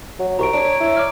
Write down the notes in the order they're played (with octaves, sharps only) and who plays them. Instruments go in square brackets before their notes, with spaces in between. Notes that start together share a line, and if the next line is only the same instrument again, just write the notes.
[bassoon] F#3
[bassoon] C2 [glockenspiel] A#5 C#6 D7
[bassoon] D4 [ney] C#5 [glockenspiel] D7
[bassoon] E4
[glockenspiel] D6 F6